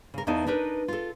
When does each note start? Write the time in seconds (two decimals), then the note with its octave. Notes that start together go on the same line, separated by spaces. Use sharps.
0.14 C#3 A#4
0.27 E2 E3 A#3 D#4 A5
0.47 D4 D#4 A#4 B4
0.88 F4 A4